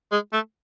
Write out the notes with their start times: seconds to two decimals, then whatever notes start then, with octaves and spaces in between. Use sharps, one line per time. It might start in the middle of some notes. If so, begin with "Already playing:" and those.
0.12 G#3
0.33 A3